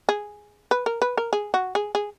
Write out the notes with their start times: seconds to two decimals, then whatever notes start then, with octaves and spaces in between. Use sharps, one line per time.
0.09 G#4
0.71 B4
0.86 A#4
1.02 B4
1.18 A#4
1.33 G#4
1.54 F#4
1.75 G#4
1.95 G#4